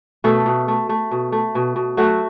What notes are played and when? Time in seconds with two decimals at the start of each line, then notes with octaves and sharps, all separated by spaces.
0.24 B2 A3 A4
0.46 B2
0.68 A3
0.89 A3
1.11 B2
1.32 A3
1.55 B2
1.76 B2
1.97 F#3 A3 F#4